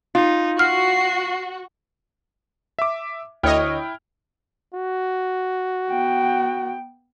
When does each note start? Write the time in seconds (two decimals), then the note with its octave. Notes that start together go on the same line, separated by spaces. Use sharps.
0.15 D#4 F4
0.59 F#4 F6 C7
2.79 E5 D6
3.43 D2 E4 C#5 D#5 G5 F6
4.74 F#4
5.90 B3 G5